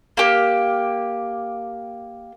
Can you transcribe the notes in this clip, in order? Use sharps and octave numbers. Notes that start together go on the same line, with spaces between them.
A#3 G4